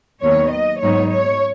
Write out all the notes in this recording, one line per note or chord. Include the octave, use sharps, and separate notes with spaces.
D#2 D#3 F#3 B3 C#5
D#5
G#2 F#3 B3 D#4 C#5
C#5